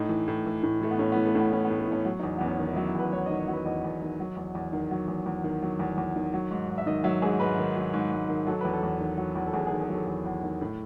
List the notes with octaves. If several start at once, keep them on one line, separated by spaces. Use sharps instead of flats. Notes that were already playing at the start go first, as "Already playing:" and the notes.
Already playing: A2 D#4
E3
A2
E3
A2
E3 A3
B3
A2 C#4
E3 B3
A3
A2 B3
E3 C#4
B3
A2
A3
E3 C#4
F#3
E2 D#4
B3
E2
C#4
D#3
D#4
F#3 E4
E4
E2 B4
E2 C#5
D#3 D#5
C#5
F#3
B4
E2 D#5
E2
D#3
F#3
E2
E2
D#3
F#3
E2
E2
D#3
F#3
E2
E2
D#3
F#3
G#2
G#2
E5
D#3 D#5
F#3 E5
G#2 G#4
G#2 B4
D#3
F#3
G#2
G#2
D#3
F#3 A4
E2 B4
A4
E2
D#3
F#3
E2
A4
E2 G#4
G#4
D#3
G#4
F#3
A4
E2 A4
E2
D#3
A2